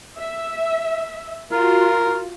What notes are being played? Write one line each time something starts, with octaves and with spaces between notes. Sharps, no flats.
E5
F4 F#4 A#4